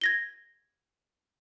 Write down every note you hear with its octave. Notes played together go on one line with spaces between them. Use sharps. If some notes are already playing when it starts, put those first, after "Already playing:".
G#6 A#6 G7